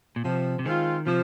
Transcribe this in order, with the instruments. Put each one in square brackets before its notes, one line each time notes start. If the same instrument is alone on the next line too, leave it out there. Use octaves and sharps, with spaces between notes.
[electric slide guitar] A#2
[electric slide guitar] C3 [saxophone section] F3
[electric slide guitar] C3
[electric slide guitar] D#3 [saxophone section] G#3 C4 F4
[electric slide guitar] C3 [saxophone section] F3